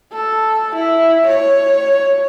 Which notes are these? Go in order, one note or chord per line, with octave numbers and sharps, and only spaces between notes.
A4
E4
C#5